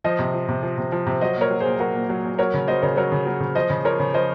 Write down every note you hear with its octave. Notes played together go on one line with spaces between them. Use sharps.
F3 C5 D#5
C3
F3
C3
F3
C3
F3
C3
F#3 C5 D#5
A#2 A#4 C#5
F#3
A#2 G#4 C5
F#3 F#4 A#4
A#2
F#3
A#2
F#3 A#4 C#5
C#3
F#3 C5 D#5
C#3 A#4 C#5
F#3 A#4 C#5
C#3
F#3
C#3
F3 C5 D#5
C#3
F3 A#4 C#5
C#3
F3 C5 D#5